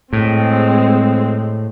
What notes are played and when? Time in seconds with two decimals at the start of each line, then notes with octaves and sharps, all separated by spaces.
0.13 A2 G#3 C4